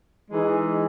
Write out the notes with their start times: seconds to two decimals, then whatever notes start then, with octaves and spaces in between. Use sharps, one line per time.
0.30 E3 G#3 D#4 G#4